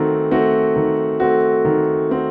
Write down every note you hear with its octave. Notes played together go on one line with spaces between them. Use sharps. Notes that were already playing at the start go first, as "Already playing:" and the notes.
Already playing: D#3 A3 C4 F#4
A3 C4 F#4
D#3
A3 C4 F#4
D#3
A3 C4 F#4